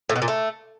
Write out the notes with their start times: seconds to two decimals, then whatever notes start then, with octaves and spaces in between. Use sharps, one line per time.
0.09 A2
0.16 B2
0.22 A#2
0.28 A3